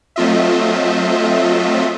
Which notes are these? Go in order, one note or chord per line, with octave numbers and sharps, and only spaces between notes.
F#3 A3 C4 F4 D#5 E5